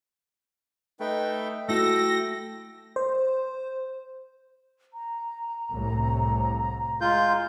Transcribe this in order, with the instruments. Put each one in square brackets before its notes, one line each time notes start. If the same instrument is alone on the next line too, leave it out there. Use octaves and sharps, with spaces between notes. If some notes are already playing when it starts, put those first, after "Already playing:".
[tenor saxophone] A3 [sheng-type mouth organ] D#4 B4 G5
[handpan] A3 E4 F#4 [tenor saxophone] A4 [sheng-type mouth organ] G5 [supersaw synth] A#6
[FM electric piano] C5
[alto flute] A#5
[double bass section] C2 A2 C3
[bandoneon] G#3 F4 G6